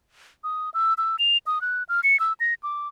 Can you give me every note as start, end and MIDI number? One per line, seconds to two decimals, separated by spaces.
0.44 0.70 87
0.74 0.94 88
0.98 1.16 88
1.19 1.37 101
1.47 1.61 87
1.61 1.83 90
1.89 2.01 89
2.04 2.19 97
2.20 2.33 88
2.40 2.54 94
2.63 2.88 86